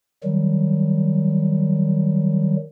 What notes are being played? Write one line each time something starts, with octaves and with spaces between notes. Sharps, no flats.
D#3 F#3 G3